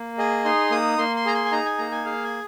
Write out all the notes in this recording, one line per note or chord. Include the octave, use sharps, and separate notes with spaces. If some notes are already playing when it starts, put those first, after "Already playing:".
Already playing: A#3
G#4 D#5
D#4 C6
A#3 D#6
A#3 C6
C6
G#4 A#5
C6
G#5
D#4 A#5
G#5
A#3 A#5
G#5
G#4 F5
G#5